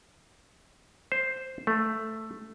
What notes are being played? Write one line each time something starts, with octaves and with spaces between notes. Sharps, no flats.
C5
A3